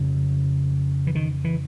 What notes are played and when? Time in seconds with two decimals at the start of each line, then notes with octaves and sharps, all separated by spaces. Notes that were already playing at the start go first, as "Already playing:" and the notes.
Already playing: F2 C#3
1.07 E3
1.15 D#3
1.44 E3